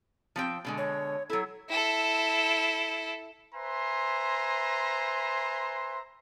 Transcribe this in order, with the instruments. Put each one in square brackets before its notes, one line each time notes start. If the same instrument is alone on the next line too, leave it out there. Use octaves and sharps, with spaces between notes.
[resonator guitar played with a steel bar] F3 C4 G5
B2 D3 G#3
[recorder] C#5
[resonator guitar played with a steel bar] F#3 E4 [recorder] A4
[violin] E4 A4
[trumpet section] B4 C5 E5 G#5 A#5 C6